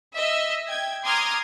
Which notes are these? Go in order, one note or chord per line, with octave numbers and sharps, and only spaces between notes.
D#5 E5 E6
G5 G#6
A#5 C6 D6 D#6 F6 G#6